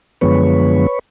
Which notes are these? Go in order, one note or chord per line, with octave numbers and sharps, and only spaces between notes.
F#2 D3 F3 G#3 B3 B4 C#5